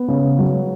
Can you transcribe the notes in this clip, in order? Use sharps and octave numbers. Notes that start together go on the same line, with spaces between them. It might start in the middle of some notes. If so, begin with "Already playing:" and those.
Already playing: B3
C#3
F#3